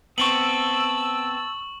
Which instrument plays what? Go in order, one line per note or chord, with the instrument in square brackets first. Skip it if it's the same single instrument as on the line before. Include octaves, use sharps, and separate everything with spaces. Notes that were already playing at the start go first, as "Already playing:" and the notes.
[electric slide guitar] B3 C4 [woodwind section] A5 E6 [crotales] C#6 F#7